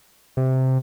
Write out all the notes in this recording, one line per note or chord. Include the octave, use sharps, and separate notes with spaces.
C3